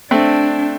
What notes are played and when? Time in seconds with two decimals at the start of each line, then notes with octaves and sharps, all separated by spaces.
0.11 A3 C4 D4